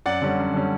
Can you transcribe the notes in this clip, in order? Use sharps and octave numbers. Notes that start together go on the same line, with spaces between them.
F#2 D5 F#5
D3 G3 C#4
F#2
D3 G3 C#4